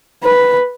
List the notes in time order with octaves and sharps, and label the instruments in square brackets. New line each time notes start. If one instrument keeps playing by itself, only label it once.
[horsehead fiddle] B4